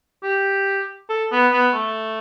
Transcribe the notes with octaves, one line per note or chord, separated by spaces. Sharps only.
G4
A4
B3
B3
A3